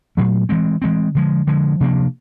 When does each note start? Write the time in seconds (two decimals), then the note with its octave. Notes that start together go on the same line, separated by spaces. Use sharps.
0.17 A#2 F#3 A3
0.49 E3 G#3 C4
0.82 E3 G#3 C4
1.15 D3 F3 G#3
1.47 D3 F3 G#3
1.80 C3 F3 A#3 D4